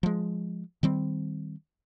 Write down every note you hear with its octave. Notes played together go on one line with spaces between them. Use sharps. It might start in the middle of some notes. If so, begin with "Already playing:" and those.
F3 G#3
D#3 G3 C4